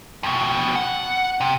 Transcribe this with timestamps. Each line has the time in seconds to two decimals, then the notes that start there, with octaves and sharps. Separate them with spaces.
0.23 F2 B2
0.76 F#5
1.41 C3